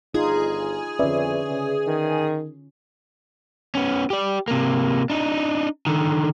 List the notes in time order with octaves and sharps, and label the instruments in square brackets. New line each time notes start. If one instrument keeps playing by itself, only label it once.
[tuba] G1 [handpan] D#4 F4 [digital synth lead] G#4
[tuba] F2 [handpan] D3 C#4 [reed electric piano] B4 D5 E5
[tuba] C#3
D#3
[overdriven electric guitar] B3 C#4
G4 D5
C3 A#3
D4 D#4
D3 D#3